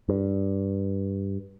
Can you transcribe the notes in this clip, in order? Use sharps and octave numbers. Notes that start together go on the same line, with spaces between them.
G2